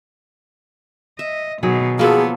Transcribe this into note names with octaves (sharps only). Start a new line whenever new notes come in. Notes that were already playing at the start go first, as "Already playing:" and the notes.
D#5 E5
B2 D#3 F#3 G#4
F3 F#3 A#3 B3 G#4 A4